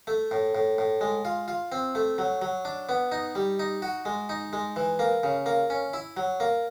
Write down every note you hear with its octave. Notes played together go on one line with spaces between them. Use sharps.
A3
A2
A2
A2
G#3
F4
F4
C4
A3
F#3
F#3
D4
B3
D#4
G3
D#4
F#4
G#3
D#4
G#3
E3
A#3
C#3
A#3
C#4
E4
F#3
A#3